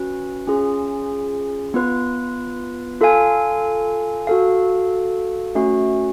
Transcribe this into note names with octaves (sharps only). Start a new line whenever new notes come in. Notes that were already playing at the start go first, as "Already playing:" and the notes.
Already playing: C#4 F#4 B4
C#4 F4 G#4
B3 F4 B4
F4 A4 F5 G#5
F#4 A4 F5
A3 C#4 F#4